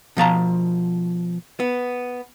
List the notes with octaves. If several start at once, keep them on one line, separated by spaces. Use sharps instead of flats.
B2 F3 A5 A#5
B3